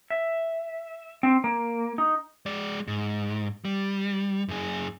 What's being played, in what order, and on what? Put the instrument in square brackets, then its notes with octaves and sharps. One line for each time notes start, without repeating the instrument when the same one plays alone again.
[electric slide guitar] E5
C4
A#3
D#4
[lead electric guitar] G#3 D5
G#2
G3
F#2 G#4